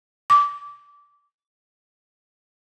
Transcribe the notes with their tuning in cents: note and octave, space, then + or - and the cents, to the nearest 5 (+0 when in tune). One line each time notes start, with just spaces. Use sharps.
D6 -20